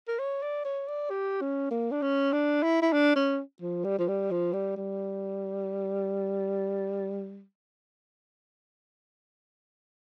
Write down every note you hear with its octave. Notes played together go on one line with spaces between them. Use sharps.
A#4
C#5
D5
C#5
D5
G4
C#4
A#3
D4
C#4
D4
E4
E4
D4
C#4
F3
G3
F3
G3
F3
G3
G3